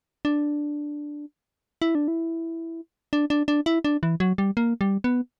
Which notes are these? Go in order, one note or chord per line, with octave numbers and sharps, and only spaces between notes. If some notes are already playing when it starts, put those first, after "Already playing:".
D4
E4
D4
E4
D4
D4
D4
E4
D4
E3
F#3
G3
A#3
G3
B3